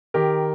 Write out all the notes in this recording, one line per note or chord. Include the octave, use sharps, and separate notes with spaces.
D#3 G4 A#4